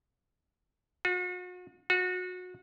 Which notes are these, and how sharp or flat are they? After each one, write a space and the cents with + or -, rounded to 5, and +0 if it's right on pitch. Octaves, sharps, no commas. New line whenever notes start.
F#4 -40
F#4 -25